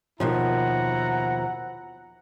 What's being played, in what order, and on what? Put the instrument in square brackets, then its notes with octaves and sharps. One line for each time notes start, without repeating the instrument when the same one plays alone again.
[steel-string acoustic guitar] D#2 B2 F3 [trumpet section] E4 F#5 A#5